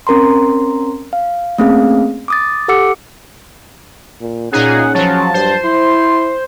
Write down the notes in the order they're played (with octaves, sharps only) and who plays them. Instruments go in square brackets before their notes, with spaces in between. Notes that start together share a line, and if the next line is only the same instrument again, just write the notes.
[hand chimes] C4 C#4 A#4 A#5 C6
F5
A3 A#3 C4 C#4 G#4 F5
D6 D#6 A6
G4 A4 F#5 D6 E6 C#7
[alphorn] A#2
[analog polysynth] A#2 D#4 G#4 [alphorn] C#4 [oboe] F#5
[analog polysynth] F3 F#3 [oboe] A5
[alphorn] G2 [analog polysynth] C5
[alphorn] E4 [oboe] C6